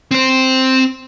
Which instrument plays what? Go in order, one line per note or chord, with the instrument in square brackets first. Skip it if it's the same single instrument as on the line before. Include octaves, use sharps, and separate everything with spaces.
[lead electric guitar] C4 C5